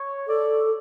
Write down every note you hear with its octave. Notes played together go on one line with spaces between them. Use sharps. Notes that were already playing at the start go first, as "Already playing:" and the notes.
Already playing: C#5
A4 D5